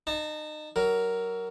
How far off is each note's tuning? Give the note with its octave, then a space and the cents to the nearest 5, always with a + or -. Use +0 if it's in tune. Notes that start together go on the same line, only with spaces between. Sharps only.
D#4 -30 A5 +0
F#3 +25 A#4 +0